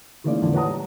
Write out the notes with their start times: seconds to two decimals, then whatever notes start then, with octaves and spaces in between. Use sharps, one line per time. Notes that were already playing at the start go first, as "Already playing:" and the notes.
0.24 D#3 E3 G#3 A#3 C#4 D5
0.42 E2 A2 D3 F3 D4 D#4
0.53 B4 C#5 F#5 A#5 D#6
0.66 G3